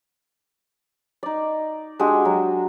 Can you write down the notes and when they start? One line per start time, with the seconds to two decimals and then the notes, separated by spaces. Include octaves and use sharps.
1.23 D#4 D5
1.99 G#3 D4 F#4 G4
2.25 F#3